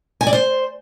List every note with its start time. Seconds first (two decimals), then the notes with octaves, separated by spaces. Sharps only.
0.21 G#5
0.27 D5
0.33 C5